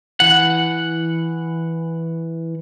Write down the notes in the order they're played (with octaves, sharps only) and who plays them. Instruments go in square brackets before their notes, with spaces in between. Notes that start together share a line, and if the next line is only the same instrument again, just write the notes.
[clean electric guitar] E3 F#5